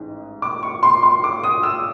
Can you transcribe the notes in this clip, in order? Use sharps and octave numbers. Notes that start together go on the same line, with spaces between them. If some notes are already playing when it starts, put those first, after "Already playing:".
Already playing: A1 G#2
D6
C#6
C6
C6
D6
D#6
E6